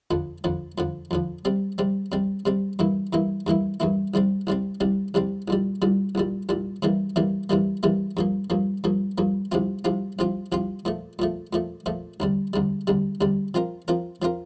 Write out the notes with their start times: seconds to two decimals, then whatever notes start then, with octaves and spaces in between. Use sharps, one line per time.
0.11 F2 D3 F3
0.44 F2 D3 F3
0.78 F2 D3 F3
1.11 F2 D3 F3
1.45 C3 G3 C4
1.78 C3 G3 C4
2.12 C3 G3 C4
2.46 C3 G3 C4
2.79 G2 E3 A#3 E4
3.13 G2 E3 A#3 E4
3.47 G2 E3 A#3 E4
3.80 G2 E3 A#3 E4
4.14 C2 C3 G3 C4
4.47 C2 C3 G3 C4
4.80 C2 C3 G3 C4
5.14 C2 C3 G3 C4
5.48 C2 A#2 G3
5.82 C2 A#2 G3
6.15 C2 A#2 G3
6.49 C2 A#2 G3
6.82 C3 E3 G3 A#3
7.16 C3 E3 G3 A#3
7.50 C3 E3 G3 A#3
7.83 C3 E3 G3 A#3
8.17 G2 F3 A#3
8.50 G2 F3 A#3
8.84 G2 F3 A#3
9.18 G2 F3 A#3
9.52 C2 C3 F3 C4 F4
9.85 C2 C3 F3 C4 F4
10.19 C2 C3 F3 C4 F4
10.52 C2 C3 F3 C4 F4
10.85 A#2 F3 A3
11.19 A#2 F3 A3
11.53 A#2 F3 A3
11.86 A#2 F3 A3
12.20 D2 C3 G3
12.53 D2 C3 G3
12.87 D2 C3 G3
13.21 D2 C3 G3
13.54 F3 C4 F4 A#4
13.88 F3 C4 F4 A#4
14.22 F3 C4 F4 A#4